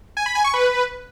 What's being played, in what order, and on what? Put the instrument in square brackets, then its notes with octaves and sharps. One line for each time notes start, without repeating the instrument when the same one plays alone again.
[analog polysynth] G#5
B5
G#5
C#6
B4